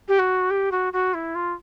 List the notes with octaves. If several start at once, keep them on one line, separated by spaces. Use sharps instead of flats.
G4
F#4
G4
F#4
F#4
E4
F4